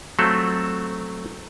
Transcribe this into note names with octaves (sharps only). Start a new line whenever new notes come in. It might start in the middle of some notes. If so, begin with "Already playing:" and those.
F#3 A3 C4 F4 A4